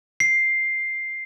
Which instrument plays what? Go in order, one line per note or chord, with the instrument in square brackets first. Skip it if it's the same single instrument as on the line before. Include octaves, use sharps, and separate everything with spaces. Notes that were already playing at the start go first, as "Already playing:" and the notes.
[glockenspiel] C7